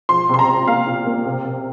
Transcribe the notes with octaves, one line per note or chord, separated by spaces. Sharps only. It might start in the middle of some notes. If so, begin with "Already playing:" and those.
F3 C6
C3 C6
A#5
C3
A#3 F5
A#2
A#3
C3
C3